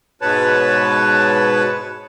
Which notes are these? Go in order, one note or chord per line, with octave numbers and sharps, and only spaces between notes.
G#2 B2 B4 C#5 A5